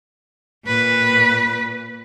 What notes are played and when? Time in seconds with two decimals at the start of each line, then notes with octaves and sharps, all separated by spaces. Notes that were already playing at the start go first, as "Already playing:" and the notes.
0.66 A#2 B4